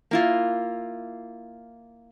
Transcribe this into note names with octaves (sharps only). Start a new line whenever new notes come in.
A#3 E4 F4